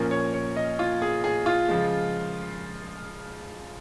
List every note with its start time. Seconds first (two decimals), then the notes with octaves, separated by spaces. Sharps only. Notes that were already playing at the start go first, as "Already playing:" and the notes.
Already playing: A#2 F3 C#4 A#4
0.11 C#5
0.34 C#5
0.57 D#5
0.79 F4
1.02 G#4
1.24 G#4
1.46 F4
1.68 C#3 F3 G#3